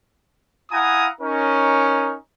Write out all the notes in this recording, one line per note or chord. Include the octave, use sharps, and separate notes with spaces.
E4 F5 F#5 G#5 A#5 D#6
C#4 D#4 A#4